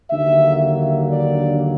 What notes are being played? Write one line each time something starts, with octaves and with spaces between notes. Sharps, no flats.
D#2 D3 F#3 A#3 E5
D5